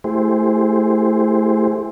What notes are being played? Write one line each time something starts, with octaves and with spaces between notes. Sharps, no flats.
A3 E4 G4 G#4 C5